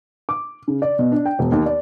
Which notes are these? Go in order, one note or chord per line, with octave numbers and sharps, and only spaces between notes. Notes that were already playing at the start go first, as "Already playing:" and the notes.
D6
C#3
D5
B2
D4
G5
E1
D#2
D5